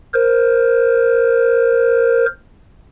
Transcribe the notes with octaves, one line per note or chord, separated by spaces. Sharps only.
A#4 C5